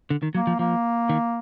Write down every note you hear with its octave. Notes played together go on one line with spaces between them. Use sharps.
D3
D#3
F#3 A#3
F3
F3 A#3
D#3